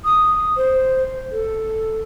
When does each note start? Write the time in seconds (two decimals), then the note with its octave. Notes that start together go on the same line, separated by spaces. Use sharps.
0.04 D#6
0.57 C5
1.32 A4